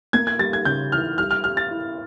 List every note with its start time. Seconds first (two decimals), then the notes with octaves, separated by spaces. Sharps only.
0.13 A#3 G#6
0.27 G#6
0.39 G3 A6
0.53 G#6
0.65 C#3 G6
0.92 E3 F6
1.18 G3 F6
1.31 F6
1.44 G4 F6
1.57 A6
1.71 E4